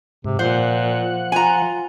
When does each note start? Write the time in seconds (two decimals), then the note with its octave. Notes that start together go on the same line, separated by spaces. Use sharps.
0.24 G#2 C3
0.39 A#2 F3 C5 F#5
1.32 F4 G#5 A#5